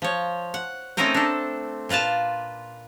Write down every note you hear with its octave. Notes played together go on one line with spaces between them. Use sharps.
F3 C#5
F#5
A3 C4 C#4 D#4 A#4 C5
D4 A4
A#2 F4 B4 F5 A5